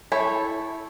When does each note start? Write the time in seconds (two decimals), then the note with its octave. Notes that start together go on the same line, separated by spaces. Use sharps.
0.12 E4 A4 C#5